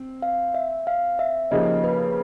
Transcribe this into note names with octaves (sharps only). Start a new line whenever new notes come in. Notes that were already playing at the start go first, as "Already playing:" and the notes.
Already playing: C4
F5
E5
F5
E5
C#3 F3 A#3 D#4 G4 D#5
B4